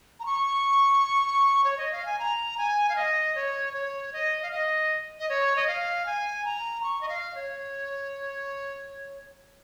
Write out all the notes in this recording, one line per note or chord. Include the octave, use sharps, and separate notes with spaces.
A#5
C#6
C#5
D#5
F5
G#5
A#5
G#5
F5
D#5
C#5
C#5
D#5
F5
D#5
D#5
C#5
D#5
F5
G#5
A#5
C#6
D#5
F5
C#5